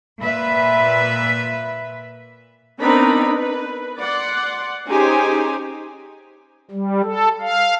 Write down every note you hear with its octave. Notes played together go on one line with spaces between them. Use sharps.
A#2 B4 E5
B3 C4 D4 D#4 A#4 B5
B4
D5 F#5 C6
C#4 D#4 G4 G#4 C5 G#5
G3
A4
F5